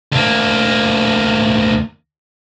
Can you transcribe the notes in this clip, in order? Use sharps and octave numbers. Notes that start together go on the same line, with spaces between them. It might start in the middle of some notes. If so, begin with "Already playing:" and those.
D2 A#3